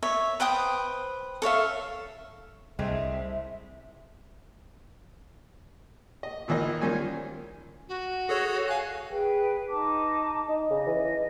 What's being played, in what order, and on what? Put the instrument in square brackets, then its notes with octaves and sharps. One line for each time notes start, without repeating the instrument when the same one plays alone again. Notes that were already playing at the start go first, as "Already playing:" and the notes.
[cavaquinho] C#5 E5
B4 C5 G5 D#6
A4 C#5 E5 F5
[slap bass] C2 [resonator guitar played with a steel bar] G#3 A3 C4 [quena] E5
[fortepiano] D#5
A#2 D#3 E3 A#3 D#5
D#3 F3 G3 C#4 F4 G#5
[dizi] F#4
[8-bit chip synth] G#4 A4 C#5
[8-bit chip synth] F5 F#6 [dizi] G#5
[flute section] G#4 B4 G5
D#4 A5 D6
[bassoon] D#4
[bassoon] C#3 [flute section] D#5
[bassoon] E3